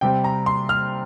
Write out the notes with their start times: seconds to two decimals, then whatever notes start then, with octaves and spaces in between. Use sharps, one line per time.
0.01 C3 G3 C4 G5
0.24 A#5
0.46 C6
0.69 F6